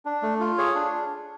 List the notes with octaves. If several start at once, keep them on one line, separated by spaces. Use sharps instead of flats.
D4
A3
F4
G#4 C#5
D4